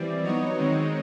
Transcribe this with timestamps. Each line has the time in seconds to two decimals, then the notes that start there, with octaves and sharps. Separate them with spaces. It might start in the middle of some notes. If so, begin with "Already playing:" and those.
Already playing: E3 G3 C4 D5
0.23 F#3 B3 D#4 C#5 D#5
0.57 D#3 G#3 C4 D#4